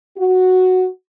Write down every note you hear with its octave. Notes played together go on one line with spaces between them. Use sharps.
F#4